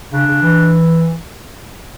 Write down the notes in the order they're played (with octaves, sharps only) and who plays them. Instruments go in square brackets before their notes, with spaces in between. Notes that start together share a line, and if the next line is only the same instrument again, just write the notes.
[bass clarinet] C#3 [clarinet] D4
[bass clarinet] C#3
E3